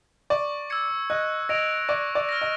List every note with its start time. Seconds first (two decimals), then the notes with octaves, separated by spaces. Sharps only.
0.30 D5 C#6
0.70 E6 G#6 C#7
1.10 D#5 F#6
1.49 D#5 A#6 D7 F7
1.89 D5 C#6
2.15 D5
2.29 F6 A#6
2.41 D#5